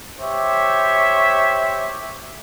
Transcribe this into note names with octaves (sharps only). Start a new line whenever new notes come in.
G4 C5 C#5 E5